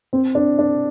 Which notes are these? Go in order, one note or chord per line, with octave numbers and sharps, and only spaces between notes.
C4
D4
D4